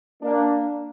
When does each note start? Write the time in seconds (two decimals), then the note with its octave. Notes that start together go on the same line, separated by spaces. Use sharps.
0.23 A#3 D4